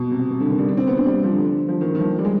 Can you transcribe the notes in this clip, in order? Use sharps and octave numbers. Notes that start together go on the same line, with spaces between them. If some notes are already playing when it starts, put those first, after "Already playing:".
Already playing: B2
C3
C3
D3
D#3
G3
D4
C4
B3
D4
G3
F3
D3
F3
D#3
D#3
F3
G3
G#3